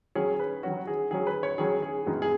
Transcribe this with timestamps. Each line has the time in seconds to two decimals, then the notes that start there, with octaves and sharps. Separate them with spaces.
0.15 D#3 F#3 C#4 G#4
0.39 B4
0.63 D#3 F#3 C#4 F#4
0.87 G#4
1.11 D#3 F#3 C#4 G#4
1.27 B4
1.43 C#5
1.58 D#3 F#3 C#4 G#4
1.82 G#4
2.06 F#2 D#3 B3 D#4
2.22 G#4